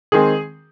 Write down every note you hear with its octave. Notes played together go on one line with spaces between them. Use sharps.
D#3 G#3 C4 G#4